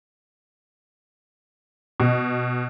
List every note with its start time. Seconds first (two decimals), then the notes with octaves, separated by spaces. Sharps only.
2.00 B2